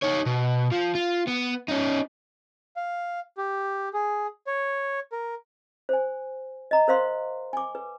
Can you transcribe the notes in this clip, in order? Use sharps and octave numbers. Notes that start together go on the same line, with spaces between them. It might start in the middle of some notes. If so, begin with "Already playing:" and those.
D#4 C#5
B2
F3
F4
B3
C#4 D#4
F5
G4
G#4
C#5
A#4
C5 G#5
D#5 A#5
A#4 C5 F5 C6
G#5 D6
B4